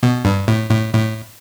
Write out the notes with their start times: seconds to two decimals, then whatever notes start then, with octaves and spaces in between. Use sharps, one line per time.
0.03 B2
0.25 G2
0.48 A2
0.70 A2
0.93 A2